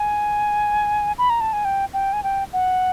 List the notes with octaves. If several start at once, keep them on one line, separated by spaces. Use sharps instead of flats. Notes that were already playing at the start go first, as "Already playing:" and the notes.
Already playing: G#5
B5
A#5
A5
G#5
G5
G5
G#5
G5
F#5